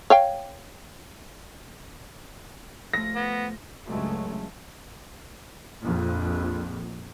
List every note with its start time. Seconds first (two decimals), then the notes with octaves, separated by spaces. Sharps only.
0.10 C#5 F5 G5
2.93 F3 A3 A#6
3.15 B3
3.87 C#2 G2 C#3 F#3 G#3 A3
5.83 A#1 F2